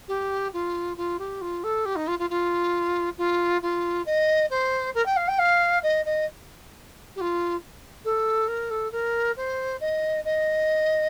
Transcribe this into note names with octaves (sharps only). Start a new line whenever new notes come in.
G4
F4
F4
G4
F4
A4
G4
D#4
F4
F4
F4
F4
F4
D#5
C5
A#4
G5
F5
G5
F5
D#5
D#5
G4
F4
A4
A#4
A4
A#4
C5
D#5
D#5